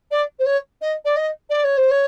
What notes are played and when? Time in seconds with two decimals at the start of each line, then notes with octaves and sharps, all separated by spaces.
0.11 D5
0.39 C5
0.45 C#5
0.81 D#5
1.04 D5
1.16 D#5
1.49 D5
1.64 C#5
1.77 C5
1.90 C#5